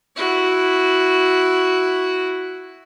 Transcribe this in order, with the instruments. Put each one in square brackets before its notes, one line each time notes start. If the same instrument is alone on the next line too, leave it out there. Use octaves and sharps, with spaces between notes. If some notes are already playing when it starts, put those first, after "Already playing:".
[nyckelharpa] E4 F#4